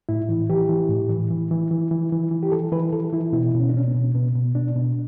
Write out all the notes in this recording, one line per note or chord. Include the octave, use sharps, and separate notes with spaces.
A2 E4
E3
E3 G4
E3
A2
E3
E3
E3
E3
E3
E3
E3
G4
E3 A4
E3 B4
E3 A4
E3 E4
B2 E4
B2
C#4
D4
B2 C#4
B3
B2
B2 B3
B2
B2 D4
B2